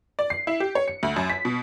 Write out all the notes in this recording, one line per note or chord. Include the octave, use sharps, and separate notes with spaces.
D5
C7
E4
G4
C#5
C#7
D2
F#2
B6
B2